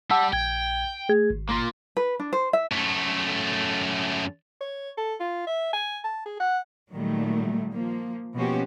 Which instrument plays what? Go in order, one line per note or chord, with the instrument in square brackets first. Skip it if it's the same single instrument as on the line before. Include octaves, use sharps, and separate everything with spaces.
[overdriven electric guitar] G3 G4 [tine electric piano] F#5 A5 E6
[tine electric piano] A#1 G#6 [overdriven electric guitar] G5
[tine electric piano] A3 G#4 G#6
G#1
[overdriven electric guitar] A#3 F4
[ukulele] B4
D4
C5
E5
[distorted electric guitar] F#2 A3
[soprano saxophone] C#5
A4
F4
E5
G#5
A5
G#4
F#5
[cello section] A#2 D#3 F#3 G3 A3
F3 A#3
B2 F3 A#3 C#4 F#4 G4